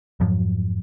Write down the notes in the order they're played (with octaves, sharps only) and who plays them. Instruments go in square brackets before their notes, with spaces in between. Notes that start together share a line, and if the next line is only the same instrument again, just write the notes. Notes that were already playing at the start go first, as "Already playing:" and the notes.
[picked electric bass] F2 G#2 F3 F#3